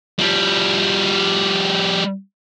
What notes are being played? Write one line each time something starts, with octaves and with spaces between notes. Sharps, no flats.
F3 G3